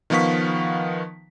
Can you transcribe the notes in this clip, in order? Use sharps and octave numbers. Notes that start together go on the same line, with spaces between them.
D#3 F3 B3 F5 C#6 B6